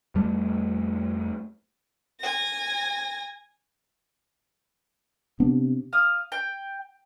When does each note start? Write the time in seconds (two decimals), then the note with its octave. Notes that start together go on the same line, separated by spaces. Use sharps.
0.15 F2 G3 A3
2.20 G#5 A#6
5.40 C3 B3 D4
5.93 F5 D#6
6.32 G5